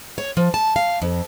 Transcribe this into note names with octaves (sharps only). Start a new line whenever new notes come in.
C#5
F3
A5
F5
F2